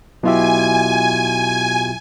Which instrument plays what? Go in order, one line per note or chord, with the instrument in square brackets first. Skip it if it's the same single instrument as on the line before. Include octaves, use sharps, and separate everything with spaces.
[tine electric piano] B2 F4 G4 [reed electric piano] F#3 E4 E5 [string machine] G#5